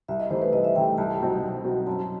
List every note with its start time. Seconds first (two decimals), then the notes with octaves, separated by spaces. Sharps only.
0.08 C2 E5
0.20 D#5
0.30 C3 E3 A3 D#4 C5
0.42 B4
0.53 C2 D#5
0.64 E5
0.75 C3 E3 A3 D#4 G5
0.98 C2 A5
1.19 B2 F#3 C4 D#4
1.42 C2
1.64 B2 F#3 C4 D#4
1.87 F#2 A5